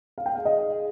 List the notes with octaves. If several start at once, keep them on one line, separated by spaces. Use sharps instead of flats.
F5
G#4 G5
D#4 F5
D#5
G#3
G#4